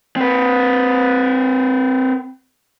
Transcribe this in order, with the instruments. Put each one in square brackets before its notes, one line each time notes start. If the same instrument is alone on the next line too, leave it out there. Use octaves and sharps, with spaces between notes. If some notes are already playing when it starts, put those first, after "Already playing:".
[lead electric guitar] C4 B4